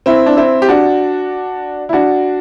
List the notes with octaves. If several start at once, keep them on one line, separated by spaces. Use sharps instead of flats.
C4 E4
D4
C4 E4
G4
D4 F#4
E4
D4 F#4